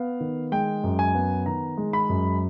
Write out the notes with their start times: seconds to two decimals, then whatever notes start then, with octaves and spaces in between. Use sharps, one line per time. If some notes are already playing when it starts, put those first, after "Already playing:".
Already playing: B3 F5
0.20 D#3
0.52 G#3 G5
0.83 F#2
0.99 G#5
1.15 B3
1.46 D#3 A#5
1.77 G#3
1.93 B5
2.09 F#2